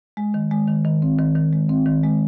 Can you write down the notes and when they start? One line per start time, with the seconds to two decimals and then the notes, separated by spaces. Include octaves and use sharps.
0.17 G#3
0.34 D#3
0.51 G#3
0.68 D#3
0.85 D#3
1.02 C4
1.19 D#3
1.35 D#3
1.53 G#3
1.69 C4
1.86 D#3
2.03 G#3